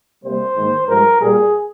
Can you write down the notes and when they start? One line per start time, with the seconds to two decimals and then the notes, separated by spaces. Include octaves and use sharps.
0.24 C3 G3 A#3 C5
0.56 G#2 D#3 A#3
0.87 G2 F3 G#3 A#4
1.19 A#2 G3 A#3 G#4